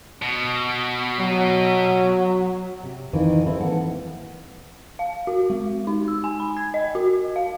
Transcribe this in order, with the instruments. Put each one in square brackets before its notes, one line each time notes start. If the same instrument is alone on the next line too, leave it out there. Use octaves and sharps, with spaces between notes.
[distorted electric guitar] B2
[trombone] F#3
[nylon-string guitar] C3
F2 D#3 E3
C4 E4 A4
A2 E3 A#3 A4 B4 F#5
[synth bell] F5
F#4
G#3
D#4
E6
G#5
B5
G#6
D#5
F#4
F5